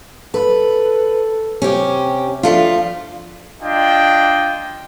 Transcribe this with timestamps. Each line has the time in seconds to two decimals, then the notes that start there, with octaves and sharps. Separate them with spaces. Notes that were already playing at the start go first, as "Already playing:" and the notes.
0.34 A4 B4
1.62 C3 C#4 G4
2.43 F3 A3 D4 F4
3.61 D4 F4 D#5 G5